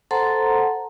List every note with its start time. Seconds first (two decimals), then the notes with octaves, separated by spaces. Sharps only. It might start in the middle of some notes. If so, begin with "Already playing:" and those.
0.11 A4 C5 F#5 A5 A#5 C6